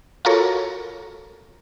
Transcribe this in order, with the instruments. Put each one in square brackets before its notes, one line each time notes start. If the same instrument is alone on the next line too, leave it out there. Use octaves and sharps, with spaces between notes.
[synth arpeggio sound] F4 F#4 A4 A#4 C#5